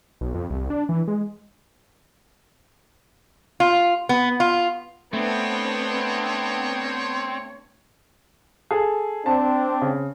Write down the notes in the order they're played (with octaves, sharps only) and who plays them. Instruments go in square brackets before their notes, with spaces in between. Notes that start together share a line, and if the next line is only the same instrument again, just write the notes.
[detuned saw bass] B1
F2
C2
D4
E3
G#3
[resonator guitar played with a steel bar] F4
B3
F4
[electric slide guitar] A3 [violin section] B3 D4 [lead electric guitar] C4 [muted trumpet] C#5
[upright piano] G#4 A4
[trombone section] C4 D4 [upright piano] A5
[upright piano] C#3